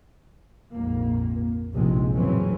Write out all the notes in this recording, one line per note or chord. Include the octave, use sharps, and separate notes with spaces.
A#1 F2 G#2 A#3
F1 A#1 A2 C3 G#3 C4
A1 C#3 E3 F#3 C4 C#4